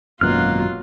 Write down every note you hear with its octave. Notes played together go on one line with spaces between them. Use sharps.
G#1 F#2 B2 F#3 A#3 F4 F6 F#6